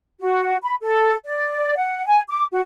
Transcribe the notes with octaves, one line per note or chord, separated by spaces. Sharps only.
F#4
B5
A4
D5
F#5
G#5
D6
F#4